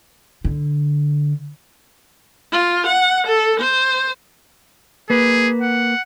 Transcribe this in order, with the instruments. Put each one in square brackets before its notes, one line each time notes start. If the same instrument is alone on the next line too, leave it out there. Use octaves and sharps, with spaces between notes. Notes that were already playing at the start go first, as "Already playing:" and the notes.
[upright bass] D3
[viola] F4
F#5
A4
C5
[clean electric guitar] A#3 B4 [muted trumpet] G#4
[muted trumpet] F#5